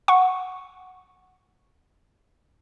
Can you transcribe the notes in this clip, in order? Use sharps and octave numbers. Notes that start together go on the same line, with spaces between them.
F#5 C#6